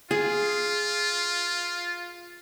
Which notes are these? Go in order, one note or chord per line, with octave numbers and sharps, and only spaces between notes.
F4 G#4